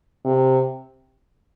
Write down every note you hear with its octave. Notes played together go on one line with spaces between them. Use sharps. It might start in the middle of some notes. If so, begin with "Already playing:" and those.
C3